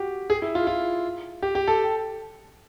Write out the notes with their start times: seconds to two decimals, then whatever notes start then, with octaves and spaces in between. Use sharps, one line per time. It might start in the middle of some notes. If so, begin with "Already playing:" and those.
Already playing: F#4 G4
0.30 G#4
0.42 E4
0.55 F4
0.67 F4
1.42 G4
1.55 G4
1.68 A4